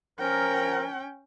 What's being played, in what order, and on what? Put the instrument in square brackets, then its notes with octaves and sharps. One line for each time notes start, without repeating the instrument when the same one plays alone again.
[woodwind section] F3 A#4 [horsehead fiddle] C#4 G5